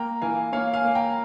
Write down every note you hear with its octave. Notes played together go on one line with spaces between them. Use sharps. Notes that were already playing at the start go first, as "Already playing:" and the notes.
Already playing: A#3 G5 A#5
E3 F5 G#5
A#3 C#5 F5
F5 G#5
A#3
G5 A#5